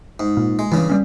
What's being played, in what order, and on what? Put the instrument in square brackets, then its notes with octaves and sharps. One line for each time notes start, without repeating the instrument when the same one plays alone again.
[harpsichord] G#2
[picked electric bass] A#2
[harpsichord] G#3
[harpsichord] G2 C#3 [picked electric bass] E3
[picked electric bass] G3 G#3 C#4